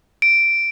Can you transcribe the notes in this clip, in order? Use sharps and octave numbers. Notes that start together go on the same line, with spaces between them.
D7